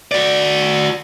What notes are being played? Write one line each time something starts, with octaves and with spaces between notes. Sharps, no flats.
F#4 D5